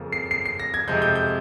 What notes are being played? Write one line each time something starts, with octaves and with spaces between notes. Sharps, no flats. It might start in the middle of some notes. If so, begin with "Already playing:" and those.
Already playing: F2 C#3 F3 A#3
C7
C7
C7
A#6
G#6
F2 C3 F3 G#3 G6
G6
G6